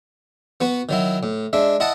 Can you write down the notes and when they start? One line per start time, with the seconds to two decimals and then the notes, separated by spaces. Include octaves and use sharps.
0.61 B3 F#4 B4
0.89 D#3 F#3 E4
1.23 A2
1.53 G#3 D4 E5
1.80 E4 D#5 F#5 A5